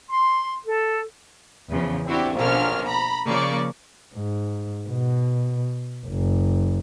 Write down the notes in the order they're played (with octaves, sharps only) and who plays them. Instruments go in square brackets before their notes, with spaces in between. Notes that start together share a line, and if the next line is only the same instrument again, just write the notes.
[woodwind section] C6
A4
[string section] E2 C#3 E3 F3
C4 D4 E4 F#4 G4
A#1 B2 D3 A#3 C#4 F6
A#5 B5
C#3 F3 A#3 D5 C#6
[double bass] G#2
B2
F#1